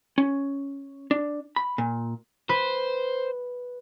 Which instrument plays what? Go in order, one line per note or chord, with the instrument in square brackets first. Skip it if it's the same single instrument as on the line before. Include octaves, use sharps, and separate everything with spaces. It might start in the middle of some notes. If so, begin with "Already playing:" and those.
[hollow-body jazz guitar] C#4
D4
B5
A#2
[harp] B4 [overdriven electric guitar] C5